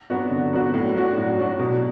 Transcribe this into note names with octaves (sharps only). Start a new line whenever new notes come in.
F#3 B3 D4 F#4
D3
F#3 B3 D4 F#4
A2
F#3 D4 F#4
A2
F#3 D4 F#4
B2